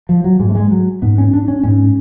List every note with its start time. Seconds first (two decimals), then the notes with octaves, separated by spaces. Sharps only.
0.09 F3
0.24 F#3
0.39 G#2 G#3
0.50 A3
0.55 G#3
0.71 F#3
1.02 G#2 B3
1.18 C#4
1.34 D4
1.48 C#4
1.63 G#2 C#4